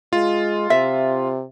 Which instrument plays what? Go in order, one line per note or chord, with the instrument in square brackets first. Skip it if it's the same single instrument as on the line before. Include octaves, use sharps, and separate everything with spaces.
[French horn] G#3 [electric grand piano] F4
[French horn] C3 [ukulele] E5